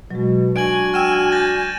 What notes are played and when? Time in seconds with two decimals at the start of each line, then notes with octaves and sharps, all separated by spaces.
0.11 B2 F#3 G#3
0.56 D4 F#4 G#5 D7 F#7
0.94 F#5 G5 E6 F6 D#7 E7
1.32 G6 A6 A#6